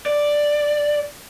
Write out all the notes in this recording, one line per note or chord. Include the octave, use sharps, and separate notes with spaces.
D5